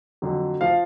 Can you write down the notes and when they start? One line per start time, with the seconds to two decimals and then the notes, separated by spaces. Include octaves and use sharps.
0.22 F2 D3 F#3
0.61 F3 F5